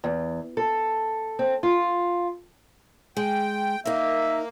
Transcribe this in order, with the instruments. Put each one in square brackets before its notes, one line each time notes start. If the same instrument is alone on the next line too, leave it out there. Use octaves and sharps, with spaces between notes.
[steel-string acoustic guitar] E2
A4
C4
F4
[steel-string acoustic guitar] G#3 [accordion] G5
[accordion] A#3 [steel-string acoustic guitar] D#4 A#4 [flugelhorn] E5